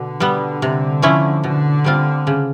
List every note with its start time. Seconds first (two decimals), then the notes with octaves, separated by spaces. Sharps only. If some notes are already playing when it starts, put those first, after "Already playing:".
Already playing: B2 D3
0.20 G3 B3
0.62 C3
1.02 F3 A3 C#4 E4
1.44 B2 D3
1.85 G3 C4 F4
2.27 C#3